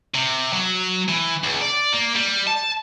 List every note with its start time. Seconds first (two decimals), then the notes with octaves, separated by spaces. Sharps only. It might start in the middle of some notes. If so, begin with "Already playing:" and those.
0.14 C3
0.53 F#3
1.09 E3
1.43 C#2
1.61 D5
1.93 A#3
2.16 G3
2.47 A5